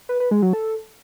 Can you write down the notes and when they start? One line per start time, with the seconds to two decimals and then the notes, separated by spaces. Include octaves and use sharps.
0.09 B4
0.20 B4
0.31 G#3
0.42 F#3
0.53 A4